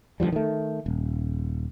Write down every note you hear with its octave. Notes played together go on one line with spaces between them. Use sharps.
D2 E3 F3 G3
D#3 A3
D#1